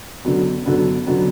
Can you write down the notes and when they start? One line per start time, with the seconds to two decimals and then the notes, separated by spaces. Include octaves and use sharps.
0.25 D3 F#3 B3
0.66 D3 F#3 B3
1.07 D3 F#3 B3